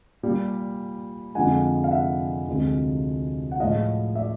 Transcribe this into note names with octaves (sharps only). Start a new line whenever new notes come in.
A#2 G3
F2 D3 F3 G#3 F#5 G#5
F5
E5 F#5
D2 C3 F3 G#3
F#5
A2 F3 G#3 D#5 F5
D5 E5